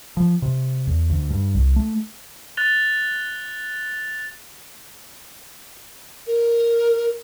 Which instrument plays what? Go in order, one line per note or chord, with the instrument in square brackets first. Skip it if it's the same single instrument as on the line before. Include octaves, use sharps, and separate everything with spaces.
[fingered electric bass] F3
C3
E2
D2
G2
C2
A3
[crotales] F#6 A6 F7 G7
[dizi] A#4